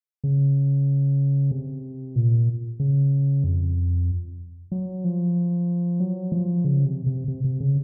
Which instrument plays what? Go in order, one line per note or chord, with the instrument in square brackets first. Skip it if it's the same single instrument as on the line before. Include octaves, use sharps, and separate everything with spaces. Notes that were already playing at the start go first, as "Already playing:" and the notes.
[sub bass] C#3
C3
A#2
C#3
F2
F#3
F3
F#3
F3
C#3
C3
C3
C3
C3
C#3